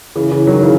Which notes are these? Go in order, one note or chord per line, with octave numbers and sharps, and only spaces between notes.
C#3 E3
C#3 E3
D#3 F#3
C#3 E3